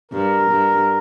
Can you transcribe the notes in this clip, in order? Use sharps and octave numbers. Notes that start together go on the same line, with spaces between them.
G2 A#4
G2